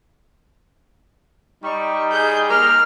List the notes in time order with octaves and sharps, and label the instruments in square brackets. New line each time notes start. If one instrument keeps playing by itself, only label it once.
[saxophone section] G3 [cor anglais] D#4 [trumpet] C#6
[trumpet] G#4 [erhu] G6
[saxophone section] A#3 G4 A#4 [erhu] F6